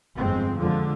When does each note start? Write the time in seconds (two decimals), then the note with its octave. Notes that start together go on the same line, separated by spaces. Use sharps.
0.18 G1 F2 G#3 C4
0.60 F2 D3 F3 G#3